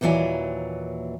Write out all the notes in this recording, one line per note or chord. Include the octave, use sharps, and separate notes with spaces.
D#2 A#2 E3 F#3 D5 G#5